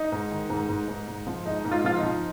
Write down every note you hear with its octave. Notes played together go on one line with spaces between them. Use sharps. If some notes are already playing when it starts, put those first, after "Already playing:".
Already playing: D#4
G#2
D#3
G#2
G#2
G#2
G#2
F3
G#2 D#4
G#2
F4
F3 F4
D#4
F3